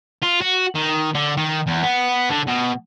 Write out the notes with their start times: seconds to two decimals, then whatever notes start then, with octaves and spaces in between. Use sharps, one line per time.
0.22 F4
0.41 F#4
0.75 D#3
1.15 D3
1.37 D#3
1.67 E2
1.83 B3
2.31 D3
2.48 B2